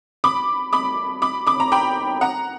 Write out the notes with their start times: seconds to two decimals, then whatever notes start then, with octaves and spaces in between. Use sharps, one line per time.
0.24 B5 D6
0.73 B5 D6
1.22 B5 D6
1.47 B5 D6
1.60 A#5
1.72 G5 B5
2.21 F#5 A#5